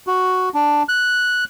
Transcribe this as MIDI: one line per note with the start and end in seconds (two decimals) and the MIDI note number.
0.07 0.49 66
0.54 0.83 62
0.89 1.44 90